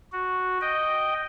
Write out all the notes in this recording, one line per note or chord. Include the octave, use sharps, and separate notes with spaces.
F#4
D#5 G5